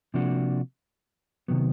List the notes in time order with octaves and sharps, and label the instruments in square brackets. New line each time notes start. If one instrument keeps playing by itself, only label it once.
[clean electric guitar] C3 F3 A#3 D4 F#4
C3 D#3 F#3 B3